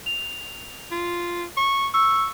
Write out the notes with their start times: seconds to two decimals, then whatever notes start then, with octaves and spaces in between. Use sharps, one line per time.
0.06 F7
0.92 F4
1.57 C#6
1.94 C#6 E6